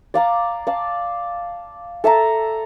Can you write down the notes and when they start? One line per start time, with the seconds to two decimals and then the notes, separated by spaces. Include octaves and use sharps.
0.14 D5 F5 A#5 D6
0.67 D5 F5 A5
2.04 A4 E5 A5 A#5